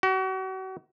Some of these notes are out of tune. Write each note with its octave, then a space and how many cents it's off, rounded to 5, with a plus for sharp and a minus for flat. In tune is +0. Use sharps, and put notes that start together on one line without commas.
F#4 +40